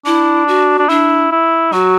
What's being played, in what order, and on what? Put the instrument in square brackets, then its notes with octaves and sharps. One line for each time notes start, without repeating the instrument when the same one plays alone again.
[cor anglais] D4 [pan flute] E4
[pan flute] F#4
[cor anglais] D4
[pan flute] D4 [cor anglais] E4
[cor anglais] E4
[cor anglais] F#3 [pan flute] F#4